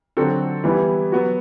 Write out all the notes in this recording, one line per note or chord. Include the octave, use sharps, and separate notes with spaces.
D3 F#3 C4 F#4 A4
E3 G3 B3 E4
F#3 B3 F#4